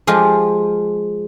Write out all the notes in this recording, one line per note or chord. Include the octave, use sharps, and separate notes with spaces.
F3 G#3 F4 G4